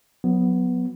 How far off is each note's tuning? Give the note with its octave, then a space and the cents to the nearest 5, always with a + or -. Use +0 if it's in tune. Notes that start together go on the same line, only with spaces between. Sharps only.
F#3 -20 B3 +0